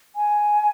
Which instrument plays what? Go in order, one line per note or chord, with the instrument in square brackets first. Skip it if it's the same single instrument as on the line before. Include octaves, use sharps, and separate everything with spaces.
[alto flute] G#5